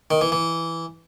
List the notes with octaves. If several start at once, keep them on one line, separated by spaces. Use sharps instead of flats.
D#3
E3
E3